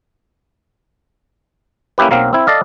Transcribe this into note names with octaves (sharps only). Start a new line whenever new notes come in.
A#3 C#4 E4 G4 B4
B1 F#3 A#3 C4 F5
C4 E4
A4 D5 D#5 F5